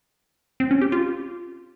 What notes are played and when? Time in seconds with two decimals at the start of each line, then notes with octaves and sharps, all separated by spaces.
0.60 C4
0.71 C#4
0.81 G4
0.92 F4